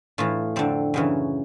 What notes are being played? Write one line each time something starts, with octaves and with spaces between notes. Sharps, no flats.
A2 E3 F4
F2 D3 C4
F#2 C#3 E3